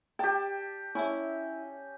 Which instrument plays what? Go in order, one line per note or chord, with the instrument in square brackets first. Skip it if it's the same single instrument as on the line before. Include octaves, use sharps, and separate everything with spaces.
[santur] G4 A5 [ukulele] G5
[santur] C#4 [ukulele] E4 E5